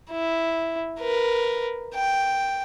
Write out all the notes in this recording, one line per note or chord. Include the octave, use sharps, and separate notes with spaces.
E4
A#4 B4
G5